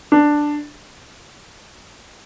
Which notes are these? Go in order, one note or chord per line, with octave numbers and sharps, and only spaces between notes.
D4